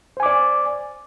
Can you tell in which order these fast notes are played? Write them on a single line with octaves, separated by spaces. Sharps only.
C5 G#5 D6 D5